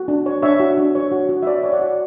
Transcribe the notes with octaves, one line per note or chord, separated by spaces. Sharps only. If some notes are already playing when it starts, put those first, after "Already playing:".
Already playing: F#4
D4
C#5
D4 C#5 E5
F#4
D4
C#5
F#4
F#4
E5
C#5 D5
C#5
D5 F#5
F#4